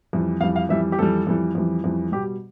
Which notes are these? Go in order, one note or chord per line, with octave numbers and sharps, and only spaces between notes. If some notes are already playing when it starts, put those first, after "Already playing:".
F2 E3 G3
F2 E3 G3 F5
F5
F2 E3 G3 E5
G4
F2 E3 G3 A4
F2 E3 G3
F2 E3 G3
F2 E3 G3
B2 G3 G4